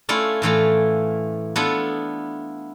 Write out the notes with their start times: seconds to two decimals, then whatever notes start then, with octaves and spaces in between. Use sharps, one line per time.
0.09 A3 C#4 E4 F4 D5
0.42 A2 E3 A3 F4
1.56 B3 D4 E4 F4 A4